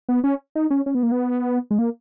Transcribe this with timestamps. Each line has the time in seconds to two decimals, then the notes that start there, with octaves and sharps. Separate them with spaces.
0.09 B3
0.24 C#4
0.55 D#4
0.70 C#4
0.86 C#4
0.95 B3
1.03 A#3
1.12 B3
1.71 G#3
1.79 A#3